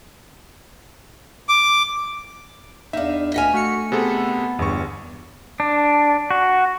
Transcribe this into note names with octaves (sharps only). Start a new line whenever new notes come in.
D6
E2 D4 D#4 E5 F5
D2 D#5 F#5 G#5 F6 B6
A3 F#4 F6 C#7
C3 B3 G#4 A4
G1 E2 G2 C#6
D4
F#4